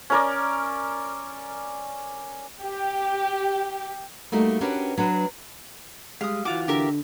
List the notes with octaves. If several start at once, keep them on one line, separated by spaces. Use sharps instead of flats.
C#4 A#4 D5
G4
G3 A3 A#3 D#4 F#4
C#4 D4 F#4 G4 A#4 B4
F#3 D4 B4
G3 G#3 F5 D#6
E3 F4 F#4 D6
D3 G4 A#4 E5